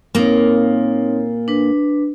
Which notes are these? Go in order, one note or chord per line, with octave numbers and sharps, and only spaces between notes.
A#2 A#3 C4 D#4 C#5
D4 B4